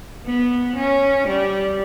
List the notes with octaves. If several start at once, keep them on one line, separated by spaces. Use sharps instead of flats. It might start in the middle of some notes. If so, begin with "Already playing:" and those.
B3
C#4
G3